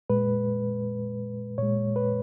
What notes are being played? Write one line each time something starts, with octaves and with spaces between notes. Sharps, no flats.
A#2 G#3 B4
A#2 G#3 C#5
B4